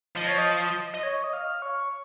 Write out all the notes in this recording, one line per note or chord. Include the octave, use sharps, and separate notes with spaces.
F3 D#5
C#5
D#5
D#5
C#5
D#5
F5
C#5